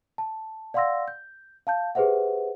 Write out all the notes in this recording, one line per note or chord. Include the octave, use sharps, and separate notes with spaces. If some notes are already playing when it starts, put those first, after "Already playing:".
A5
D5 F5 F#5 C6 E6 A#6
G6
F5 A5 G6
G4 G#4 B4 C5 E5 F#5